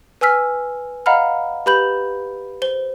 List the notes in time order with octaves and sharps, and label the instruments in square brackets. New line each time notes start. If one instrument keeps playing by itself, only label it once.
[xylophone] B4 G#5 E6 F6 B6
D#5 F5 F#5 A#5 B5 F6
G4 B4 B5 G6 F#7
C5 G7